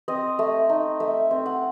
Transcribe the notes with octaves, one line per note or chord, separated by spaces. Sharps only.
C4 D#5
A3
D#4
A3 E5
C4
F#5